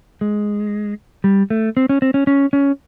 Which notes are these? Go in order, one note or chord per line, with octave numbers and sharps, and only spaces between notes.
G#3
G3
A3
C4
C#4
C4
C#4
C#4
C#4